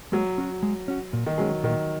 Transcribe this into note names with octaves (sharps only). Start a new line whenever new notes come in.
F#3 G#3
C#4 F#4
G#3
C#4 F#4
A#2
D#3
F#3 G#3 C#4 G#4
A#2 D#3